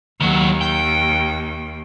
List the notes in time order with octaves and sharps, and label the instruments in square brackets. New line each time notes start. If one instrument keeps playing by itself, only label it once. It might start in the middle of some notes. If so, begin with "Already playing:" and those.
[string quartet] D#2 [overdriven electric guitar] D#3 F#3
[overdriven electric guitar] G5